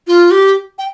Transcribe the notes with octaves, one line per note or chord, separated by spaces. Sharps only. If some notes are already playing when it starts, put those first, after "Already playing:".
F4
G4
G5